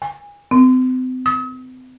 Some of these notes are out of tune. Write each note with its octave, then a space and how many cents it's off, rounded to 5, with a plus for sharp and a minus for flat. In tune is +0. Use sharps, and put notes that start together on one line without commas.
G#5 -30
C4 -40
D#6 +45